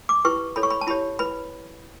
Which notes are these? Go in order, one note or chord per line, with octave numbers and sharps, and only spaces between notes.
D6
E4 G4 B4 C#6
E4 A4 C#5 B5
C#6
B5
A5
E4 G4 C#5 B5
E4 B4 B5